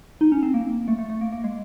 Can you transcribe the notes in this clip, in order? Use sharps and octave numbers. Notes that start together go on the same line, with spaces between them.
D#4
C#4
C4
A#3
A3
A3
A3
A#3
A#3
G#3